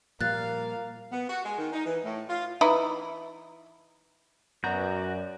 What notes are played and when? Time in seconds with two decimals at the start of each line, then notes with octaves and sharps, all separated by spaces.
0.21 A#2 F3 G3 A#3 F5 F#6 A6
1.12 B3
1.29 F#4
1.45 G#3
1.58 D#3
1.73 D#4
1.86 E3
2.05 A2
2.30 F4
2.61 E3 D#4 E4
4.64 F#2 B3 F#4 D5 A#5 G6